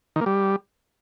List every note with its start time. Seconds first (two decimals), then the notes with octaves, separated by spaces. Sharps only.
0.16 D#3
0.21 A#3
0.26 G3